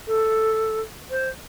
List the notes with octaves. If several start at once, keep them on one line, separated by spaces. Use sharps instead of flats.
A4
C5